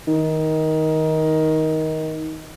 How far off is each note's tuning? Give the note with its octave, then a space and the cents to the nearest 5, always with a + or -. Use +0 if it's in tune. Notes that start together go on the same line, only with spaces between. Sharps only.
D#3 +15